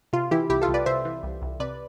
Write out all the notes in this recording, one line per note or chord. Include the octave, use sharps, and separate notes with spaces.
C3 F4
E3 E4 G4
C2 E4 G4
F4 A4
C2
B4 D5
C3 C5 E5
E3
C2
C2
C3 B4 D5